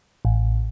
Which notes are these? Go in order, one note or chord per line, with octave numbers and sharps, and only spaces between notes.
A1